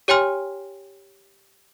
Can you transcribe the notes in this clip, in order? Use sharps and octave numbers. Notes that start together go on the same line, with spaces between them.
G4 C#5 G5 G#5 C6 F6